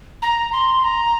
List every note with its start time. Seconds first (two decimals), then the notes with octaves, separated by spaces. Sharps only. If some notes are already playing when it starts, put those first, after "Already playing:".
0.22 A#5
0.53 C6
0.84 A#5